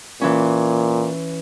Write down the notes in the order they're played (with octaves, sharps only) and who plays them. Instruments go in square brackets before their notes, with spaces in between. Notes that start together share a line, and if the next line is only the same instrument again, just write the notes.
[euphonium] A#2 [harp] E3 C#4